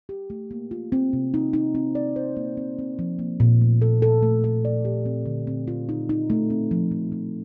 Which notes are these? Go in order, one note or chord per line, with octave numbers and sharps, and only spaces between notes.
G4
A3
A#3
F4
C4
C3
D#4
D#4
C4
D5
C5
A#3
C4
C4
F3
A#3
A#2
A3
A4
A4
A3
A4
D5
G4
C4
D3
C4
F4
D#4
D#4
A3
C4
F3
F3
F3